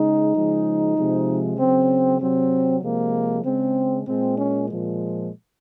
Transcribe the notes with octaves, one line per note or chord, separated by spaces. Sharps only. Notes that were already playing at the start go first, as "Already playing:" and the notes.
Already playing: C#3 G#3 D#4
C#3 F3 G#3
C3 F3 G#3
C#3 F#3 C4
C3 F#3 C4
C3 F3 G#3 A#3
C#3 G#3 C4
A#2 G#3 C4
C#4
A#2 F3 G#3